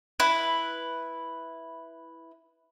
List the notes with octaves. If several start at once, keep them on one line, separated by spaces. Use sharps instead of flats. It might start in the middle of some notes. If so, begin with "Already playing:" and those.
E4 B4